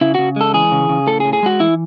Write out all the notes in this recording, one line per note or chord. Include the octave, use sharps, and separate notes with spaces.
C#3 E4
C#3 F#4
G#3 A4
E3 G#4
C#3
C#3
A2 A4
G#4
A2
G#4
G#3 F#4
E3 E4